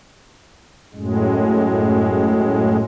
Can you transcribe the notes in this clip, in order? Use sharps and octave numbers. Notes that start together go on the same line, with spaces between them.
F#2 A2 G#3